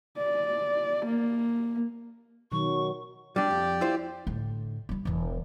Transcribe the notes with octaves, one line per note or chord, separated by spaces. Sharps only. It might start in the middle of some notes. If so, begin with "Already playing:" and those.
D5
A#3
B2 D#3 F#3 C#6
G3 D4 G4 D5
F2
E4 F4 C5
A2 D3
G3 E4
E1 E3